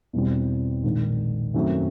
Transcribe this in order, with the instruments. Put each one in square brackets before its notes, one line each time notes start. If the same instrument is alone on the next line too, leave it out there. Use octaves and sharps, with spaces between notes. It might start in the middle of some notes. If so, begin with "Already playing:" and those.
[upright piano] E2 B2 G3 C4
A#1 G#2 D#3
F#2 D#3 F#3 A3 C4